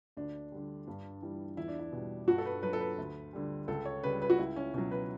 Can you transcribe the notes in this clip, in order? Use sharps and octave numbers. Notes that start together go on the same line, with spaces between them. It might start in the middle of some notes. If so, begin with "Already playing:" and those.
D2 D4
D3 G3
G2
E3 G3
E2 E4
D4
E4
B2 G3
G2 F#4
A4
B4
F#3 B4
A4
B4
D2
D3 G3
C#2 A4
C#5
C#3 G3 B4
B4
F#4
C#2 E4
C#4
B2 F#3 C#4
B4